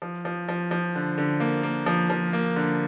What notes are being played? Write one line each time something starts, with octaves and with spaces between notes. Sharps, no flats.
F3
F3
F3
F3
D3
D3
A#3
A#3
F3
F3
A#3
D3